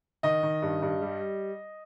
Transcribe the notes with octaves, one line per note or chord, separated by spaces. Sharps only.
D#3 D#5
D#3
G2
G2
G3